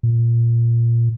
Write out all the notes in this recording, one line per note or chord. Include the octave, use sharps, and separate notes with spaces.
A#2